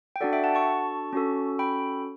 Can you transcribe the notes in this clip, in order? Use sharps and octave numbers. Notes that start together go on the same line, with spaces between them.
G5
D4 F#4 A4 D5 F#5
E5 G5
F#5 A5
A5 C#6
C#4 F#4 A4
G5 B5